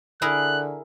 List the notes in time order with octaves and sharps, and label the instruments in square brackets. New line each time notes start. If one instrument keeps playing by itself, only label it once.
[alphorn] D3 [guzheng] E4 G#4 A#4 [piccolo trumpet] F#6